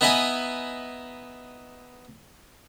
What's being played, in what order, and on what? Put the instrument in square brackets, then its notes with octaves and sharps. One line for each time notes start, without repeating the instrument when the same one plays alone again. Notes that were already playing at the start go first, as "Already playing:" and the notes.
[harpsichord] B3 D#4 E4 B4 D#5 G#5